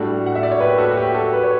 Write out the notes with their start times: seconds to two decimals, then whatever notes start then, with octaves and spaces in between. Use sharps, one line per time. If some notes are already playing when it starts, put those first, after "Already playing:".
Already playing: A2 G3 D4 F#4 A4
0.26 F#5
0.35 E5
0.43 D5
0.51 C#5
0.60 G4 B4
0.78 F#4 A4
0.91 F#4
0.97 G4
1.14 F#4 A4
1.33 B4
1.44 C#5